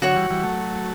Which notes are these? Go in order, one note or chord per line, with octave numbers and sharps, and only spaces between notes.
D3 F#3 F#4 C#5 F#5
E3 G3
E3 G3
F#3 A3